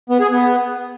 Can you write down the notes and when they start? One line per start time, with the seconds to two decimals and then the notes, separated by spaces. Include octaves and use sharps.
0.10 B3
0.20 G#4
0.31 B3